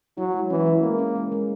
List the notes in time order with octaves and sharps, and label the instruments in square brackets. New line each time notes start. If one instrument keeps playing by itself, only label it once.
[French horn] F#3 [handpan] E4
[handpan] G#3
[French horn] E3 [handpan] C#4
[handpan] C#4
[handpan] G#3 [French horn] A#3
[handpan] C#4
G#3
G#3